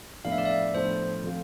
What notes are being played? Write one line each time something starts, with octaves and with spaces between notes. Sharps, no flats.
A2 F3 B3 D4 A4 F5
E5
D5
E5
A2 F3 B3 D4 A4 C5
F3 A3 C4 F4